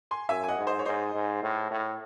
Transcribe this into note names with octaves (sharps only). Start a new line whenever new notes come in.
G#5 C6
F#2 E5 G#5
G#5
D#5 F#5
G#2
C5 D#5
C#5
G#2 C5 D#5
G#2
A2
A2